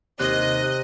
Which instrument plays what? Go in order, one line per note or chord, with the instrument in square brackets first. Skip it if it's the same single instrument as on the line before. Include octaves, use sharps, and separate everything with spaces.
[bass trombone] D#2 [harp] C3 [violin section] D#5 [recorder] F#6